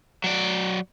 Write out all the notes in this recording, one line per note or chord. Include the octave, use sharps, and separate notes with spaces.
F#3 D5